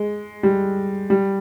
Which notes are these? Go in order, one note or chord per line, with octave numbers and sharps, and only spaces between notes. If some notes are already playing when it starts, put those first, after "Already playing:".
Already playing: G#3
G3
G3